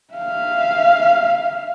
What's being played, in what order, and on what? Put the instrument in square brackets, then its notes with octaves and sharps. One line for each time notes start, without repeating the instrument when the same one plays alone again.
[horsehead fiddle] E5 F5